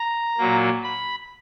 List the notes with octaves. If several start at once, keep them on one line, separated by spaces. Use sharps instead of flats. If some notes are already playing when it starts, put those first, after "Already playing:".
Already playing: A#5
A#2 F#3 A#3
B5